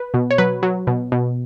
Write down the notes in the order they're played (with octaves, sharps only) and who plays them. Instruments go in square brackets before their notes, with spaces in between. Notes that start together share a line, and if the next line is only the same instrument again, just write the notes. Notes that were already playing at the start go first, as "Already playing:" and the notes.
Already playing: [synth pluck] B4
B2
C#5
F#3 B4
F#3
B2
B2